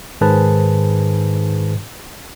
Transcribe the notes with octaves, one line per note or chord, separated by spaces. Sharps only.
G#2 D#3 G#4 B4 C5 A5